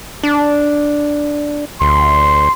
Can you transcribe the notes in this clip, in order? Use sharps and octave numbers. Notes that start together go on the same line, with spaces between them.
D4
D2 C6